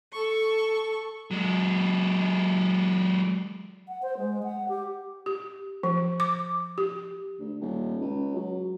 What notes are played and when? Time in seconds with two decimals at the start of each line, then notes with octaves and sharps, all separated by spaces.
0.13 A4 C#6
1.31 F#3 G#3
3.88 F#5
4.03 C5
4.17 G#3
4.43 F#5
4.69 G4
5.26 G4
5.83 F3
6.20 D6
6.78 G4
7.39 D2
7.61 D#1
8.01 C#2
8.35 F#3